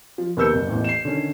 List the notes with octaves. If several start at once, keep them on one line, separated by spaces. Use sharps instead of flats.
F3
D#2 B3 A#4 E6 G6 C#7
F#1
A1 E2 A2
C7 E7
D3 D#3 C#4